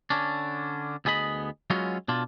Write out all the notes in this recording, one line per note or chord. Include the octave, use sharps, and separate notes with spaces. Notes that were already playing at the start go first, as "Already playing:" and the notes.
D3 C#4 D4
D2 B3 G#4 D#5 B5
F#3 G#3 B3 C#4 F4 F#4
B2 D4 F4